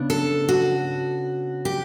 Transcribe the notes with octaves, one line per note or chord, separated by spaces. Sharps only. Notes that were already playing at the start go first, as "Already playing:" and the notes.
Already playing: C#3 B3 D4
A4
F#4
G4